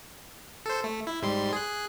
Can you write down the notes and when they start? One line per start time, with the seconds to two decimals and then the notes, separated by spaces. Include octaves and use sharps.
0.66 A4 C5
0.84 A3
1.07 E4
1.22 G#2 G3 C6
1.53 G#4 F#6